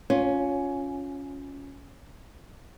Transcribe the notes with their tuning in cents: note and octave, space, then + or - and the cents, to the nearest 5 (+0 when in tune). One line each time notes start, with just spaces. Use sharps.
C#4 +10 F4 +20